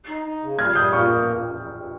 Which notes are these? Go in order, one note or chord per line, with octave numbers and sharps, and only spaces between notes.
D#4
D#4
C#3
G3 F6 G#6
G3 D#6 G6
A#3 C#6 F6